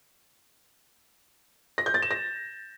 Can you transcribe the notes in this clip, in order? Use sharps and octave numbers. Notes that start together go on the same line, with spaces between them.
A#6
G6
A6
E7
A#6